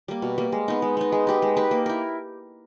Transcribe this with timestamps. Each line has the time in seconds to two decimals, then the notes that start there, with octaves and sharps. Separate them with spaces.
0.08 G3 A#3
0.22 B2
0.38 G3 A#3
0.52 G#3
0.68 B3 D#4
0.82 G#3
0.97 B3 D#4
1.12 G#3
1.27 D#4 G4 B4
1.42 G#3
1.57 D#4 G4 B4
1.71 A#3
1.86 E4 A#4